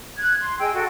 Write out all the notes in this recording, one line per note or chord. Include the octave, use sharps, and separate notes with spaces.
F#6 G#6
C6
G#4 D#5 G5 E6
F#4 A4